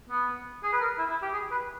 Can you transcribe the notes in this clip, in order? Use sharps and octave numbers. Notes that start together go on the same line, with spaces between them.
B3
G#4
B4
A#4
E4
E4
G4
G#4
B4